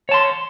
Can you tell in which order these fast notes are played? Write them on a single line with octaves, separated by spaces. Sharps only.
C#5 A5 C6